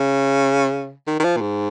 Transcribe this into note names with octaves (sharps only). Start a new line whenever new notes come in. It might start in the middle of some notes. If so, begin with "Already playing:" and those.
Already playing: C#3
D#3
D#3
F3
A#2
G#2